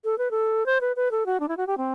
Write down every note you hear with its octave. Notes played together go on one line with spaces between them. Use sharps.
A4
B4
A4
C5
B4
B4
A4
F#4
D4
E4
F#4
G4
C4